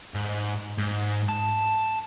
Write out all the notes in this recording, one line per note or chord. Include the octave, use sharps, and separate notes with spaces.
G#2
G#2
A5